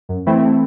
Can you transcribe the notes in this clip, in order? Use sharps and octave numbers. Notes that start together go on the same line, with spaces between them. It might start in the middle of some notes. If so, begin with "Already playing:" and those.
F#2
E3 A3 C4 E4